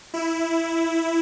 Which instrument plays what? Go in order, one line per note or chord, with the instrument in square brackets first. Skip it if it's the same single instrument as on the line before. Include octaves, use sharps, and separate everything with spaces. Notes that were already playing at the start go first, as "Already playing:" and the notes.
[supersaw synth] E4